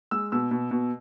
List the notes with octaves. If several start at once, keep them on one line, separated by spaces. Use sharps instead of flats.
G#3 E6
B2 E6
B2
B2